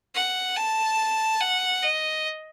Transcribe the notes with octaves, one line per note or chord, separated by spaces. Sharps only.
F#5
A5
F#5
D#5